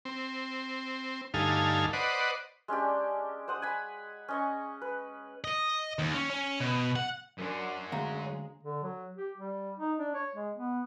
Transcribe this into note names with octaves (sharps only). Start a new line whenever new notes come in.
C4
D2 G2 D#4 A4 F5 G#5
B4 C5 D5 D#5 F#5
G#3 C#4 D4 G4
C5 F#5 D#6
G#5 B5
C#4 D#5 C#6
B4
D#5
D#2
C#4
C#4
B2
F#5
F#2 C#4 D4 A#4 C6
D2 G#3 F5 A#5
D3
F#3
G4
G3
D#4
D4
C#5
G#3
B3